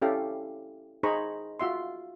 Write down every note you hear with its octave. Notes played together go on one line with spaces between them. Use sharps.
C#4 E4 G4 A4 F5
D#4 G#4 C5 A#5 B5 C#6
F4 F#4 E5 C6